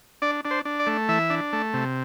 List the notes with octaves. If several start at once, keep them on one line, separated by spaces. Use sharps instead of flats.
D4 D5
D4
C5
D4
D5
A3
E3 E5
D4
A3
C3